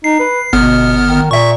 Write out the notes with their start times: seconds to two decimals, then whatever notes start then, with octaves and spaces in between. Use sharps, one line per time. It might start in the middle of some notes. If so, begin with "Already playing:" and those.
0.04 D#4 C7
0.19 B4
0.53 G1 B2 B3 F6
1.07 D#3
1.31 A#2 E5 C#6